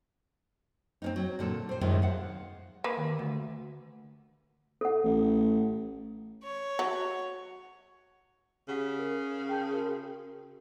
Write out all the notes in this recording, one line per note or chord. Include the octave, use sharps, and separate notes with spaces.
C4 C#4 D#4
F#3
A#2 D3 A4
C4 C5
F#2 A2 C3 D#3 F3 G#3
F5 F#5
A#3 B4
D#2
D2
A4 F#5
A1
C#5
F#3
C#3 G4 F#5 B6
A#4
G5 A5 G6
F#4 A#4